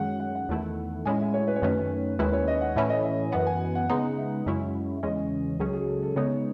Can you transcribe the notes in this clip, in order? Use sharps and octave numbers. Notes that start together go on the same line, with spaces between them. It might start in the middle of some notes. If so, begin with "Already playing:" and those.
Already playing: F#2 D#3 G#3 C#4 F#5
F#5
F#5
E2 D#3 A3 E4
A2 G#3 C#4 E4 G#5
E5
C#5
B4
C#5
F#2 D#3 A3 C#4 B4
D#2 D#3 G#3 C#4 E4 B4
C#5
D#5
F#5
A2 E3 A3 C#4 E4 E5
D#5
E5
F#2 E3 B3 F#5
G#5
F#5
C#3 G#3 B3 D#4
E5
F#2 C#3 G#3 C#4 E4
E2 C#3 E3 G#3 C#4 D#5
C#2 C#3 F#3 C#4 G#4
G#4
A4
A4
C#3 G#3 B3 D#4 C#5